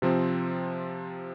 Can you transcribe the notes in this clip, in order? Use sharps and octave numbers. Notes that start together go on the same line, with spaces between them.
C3 F3 C4